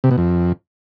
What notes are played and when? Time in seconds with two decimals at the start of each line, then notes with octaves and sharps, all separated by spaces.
0.04 C3
0.11 B2
0.18 F2